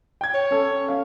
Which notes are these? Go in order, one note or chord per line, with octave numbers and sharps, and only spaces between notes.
G5 G#6
C#5
C#4 A4
C#4 F5